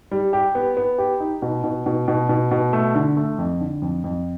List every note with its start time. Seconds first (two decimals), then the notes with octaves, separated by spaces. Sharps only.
0.11 G3
0.33 G4
0.55 B3
0.77 B3
0.98 G4
1.20 D#4
1.42 B2
1.64 B2
1.86 B2
2.08 B2
2.29 B2
2.51 B2
2.73 A3
2.95 D3
3.17 A3
3.38 F2
3.60 D3
3.82 F2
4.04 F2